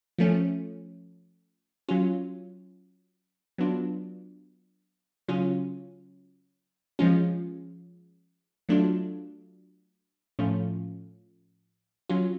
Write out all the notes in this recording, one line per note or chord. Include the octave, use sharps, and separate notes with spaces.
F3 A3 C#4
F#3 C#4 F4
F#3 B3 D4 F4
C#3 F#3 C#4 F4
F3 G#3 C#4 F4
F#3 A3 D4 F4
A2 F3 A3 C#4 F4
F#3 C#4 F4